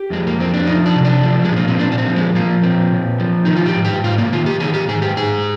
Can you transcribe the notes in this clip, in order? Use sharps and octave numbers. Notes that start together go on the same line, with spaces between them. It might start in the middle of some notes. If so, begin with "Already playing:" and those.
Already playing: G4
F2 G#3
A#3
F2 C4
D4
F3 D#4
D4
C3
D4
F3
G#3
A#2
A#3
C4
A#2 D4
D4
C4
F3
G#3
F3 A#3
A#2 C4
A#2
F3
D#3 D#4
F4
G4
G#2
G4
G#2 F4
A#3
D#3 F4
G4
D#3 G#4
G4
G#2 G#4
G4
G#2 G#4